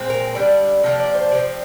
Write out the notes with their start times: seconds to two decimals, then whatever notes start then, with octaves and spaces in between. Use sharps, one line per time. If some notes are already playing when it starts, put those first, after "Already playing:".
Already playing: A#2 G#3 C4
0.10 A#4
0.35 D3 G3 D4 D5
0.83 C3 F3 A#3 D4 D#5
1.00 D5
1.15 C5
1.31 C3 F3 C4 D5